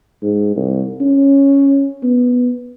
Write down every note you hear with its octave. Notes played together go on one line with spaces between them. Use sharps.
G#2
C2
C#4
B3